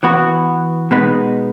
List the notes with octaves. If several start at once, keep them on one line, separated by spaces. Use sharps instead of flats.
E3 B3 F#4
B2 G#3 B3 D#4